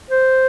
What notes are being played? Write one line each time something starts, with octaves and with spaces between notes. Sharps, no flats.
C5